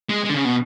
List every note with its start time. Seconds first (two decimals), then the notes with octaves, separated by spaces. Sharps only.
0.09 G#3
0.24 G#3
0.29 D3
0.34 C#3
0.45 B2